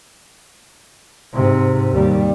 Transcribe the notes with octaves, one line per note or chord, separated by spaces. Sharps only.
G#2 C3
D#2 G3